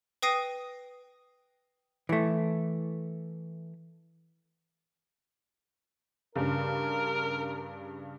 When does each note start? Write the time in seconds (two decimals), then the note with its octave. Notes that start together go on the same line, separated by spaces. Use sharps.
0.22 B4 G5 D#6 A#6 C7 D#7
2.09 E3 A3
6.36 G2 C#3 A#4